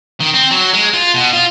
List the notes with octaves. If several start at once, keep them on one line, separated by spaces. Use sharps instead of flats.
D#3
C4
F#3
G#3
F4
B2
F4